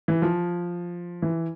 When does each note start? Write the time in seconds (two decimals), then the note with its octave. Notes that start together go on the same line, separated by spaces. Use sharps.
0.08 E3
0.22 F3
1.22 E3